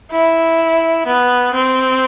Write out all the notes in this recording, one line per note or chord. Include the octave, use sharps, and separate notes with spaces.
E4
B3
C4